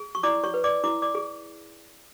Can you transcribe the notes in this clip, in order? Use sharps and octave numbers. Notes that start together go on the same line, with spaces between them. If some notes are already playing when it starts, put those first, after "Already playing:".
Already playing: G#4
C#6
E4 D5 D6
C#5 C#6
B4
D5 D6
E4 D6
D5 D6
G#4